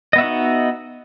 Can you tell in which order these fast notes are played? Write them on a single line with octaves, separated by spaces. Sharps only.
D#5 B3 E5 F#4 D#4